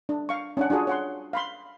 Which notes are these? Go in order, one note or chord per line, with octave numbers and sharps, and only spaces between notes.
D4
F5 C#6
C#4 D4 F#5
D4 F4 F#4 G#4
C#5 F#5 C6
F5 B5 C6